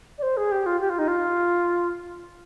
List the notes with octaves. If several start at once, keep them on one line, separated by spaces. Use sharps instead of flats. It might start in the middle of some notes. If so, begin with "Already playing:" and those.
D5
C5
G#4
G4
F4
G4
F4
D#4
F4